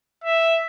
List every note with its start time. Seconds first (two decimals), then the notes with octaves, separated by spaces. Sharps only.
0.24 E5